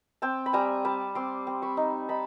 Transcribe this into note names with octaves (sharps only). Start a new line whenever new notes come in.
C4 G5 A5
B5
G3 G#5 A#5
G3 A5 B5
C4 C6 D6
C4
B5 C#6
D#4
D#4 A5 B5